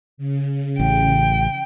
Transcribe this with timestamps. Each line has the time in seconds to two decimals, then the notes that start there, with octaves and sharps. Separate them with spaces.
0.17 C#3
0.80 A1 G5